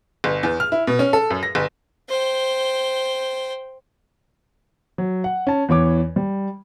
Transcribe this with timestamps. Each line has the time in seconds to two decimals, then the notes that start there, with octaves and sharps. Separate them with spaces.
0.24 G1
0.43 E2
0.60 F6
0.72 E4
0.87 B2
0.99 C#4
1.13 A4
1.30 F#2
1.43 A#6
1.55 G1
2.09 C5 G5
4.98 F#3
5.24 F#5
5.47 C#4 A5
5.69 E2 E3 C#5 D6
6.16 G3